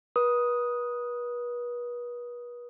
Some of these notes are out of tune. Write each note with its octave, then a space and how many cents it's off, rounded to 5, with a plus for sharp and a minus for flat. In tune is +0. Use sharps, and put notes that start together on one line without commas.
B4 -35 D#6 +0